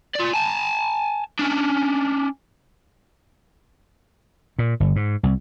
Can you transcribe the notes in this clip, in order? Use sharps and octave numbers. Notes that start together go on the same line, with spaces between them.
F4 D5
G#5 A5
C#4 D4
A#2
G1
G#2
C2